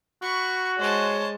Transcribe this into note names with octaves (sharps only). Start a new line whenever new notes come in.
F#4 B5 C#6
G#3 C5 C#5 A5